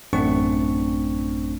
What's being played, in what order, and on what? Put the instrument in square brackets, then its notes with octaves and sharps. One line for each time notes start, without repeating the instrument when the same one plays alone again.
[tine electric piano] A1 F#2 A3 C4 D4 C#6